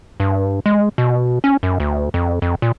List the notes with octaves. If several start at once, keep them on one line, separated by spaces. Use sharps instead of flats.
G2
G#3
B2
C#4
F#2
D2
F2
F2
A#2